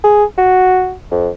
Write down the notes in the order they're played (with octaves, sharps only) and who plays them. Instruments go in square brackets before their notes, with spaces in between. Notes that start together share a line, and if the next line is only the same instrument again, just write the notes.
[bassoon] G#4
F#4
F2